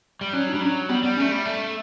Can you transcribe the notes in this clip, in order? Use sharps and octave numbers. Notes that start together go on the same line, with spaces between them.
G3
F#3 C#4
D4
G3
F#3 C#4
G3 B3
G3 B3
A3 C#4
G3
A3